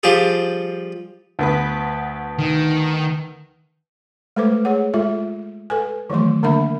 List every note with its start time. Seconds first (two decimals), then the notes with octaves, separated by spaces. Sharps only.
0.03 F3 G3 G4 G#4
1.39 D2 B3 B4
2.39 D#3
4.36 G#3 A3 A4 B4 C5 D6
4.65 G#4 C#5 F#5
4.94 G#3 F4 A4 E5
5.70 A4 B4 G#5
6.10 D#3 E3 F#3 A3 C6
6.43 D3 A#3 D4 A#4 E5 B5